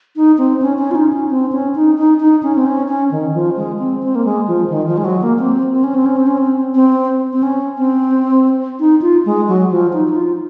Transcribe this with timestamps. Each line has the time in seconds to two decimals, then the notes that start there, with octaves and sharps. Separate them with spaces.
0.16 D#4
0.38 C4
0.62 C#4
0.78 C#4
0.91 F4
0.95 D#4
1.13 C#4
1.30 C4
1.52 C#4
1.75 D#4
1.98 D#4
2.20 D#4
2.43 C#4
2.55 C4
2.66 C#4
2.88 C#4
3.11 D#3
3.34 F3
3.56 G#3
3.79 C4
4.02 C4
4.15 A#3
4.25 G#3
4.48 F3
4.70 D#3
4.87 F3
4.97 G#3
5.05 F#3
5.21 A#3
5.39 C4
5.73 C4
5.84 C#4
5.94 C4
6.06 C#4
6.16 C4
6.27 C#4
6.38 C4
6.75 C4
7.33 C4
7.43 C#4
7.77 C4
8.80 D#4
9.02 F4
9.25 G#3
9.48 F#3
9.71 F3
9.93 D#4
10.08 D#4
10.16 F4